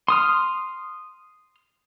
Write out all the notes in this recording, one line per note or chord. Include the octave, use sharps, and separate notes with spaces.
C6 D#6 F6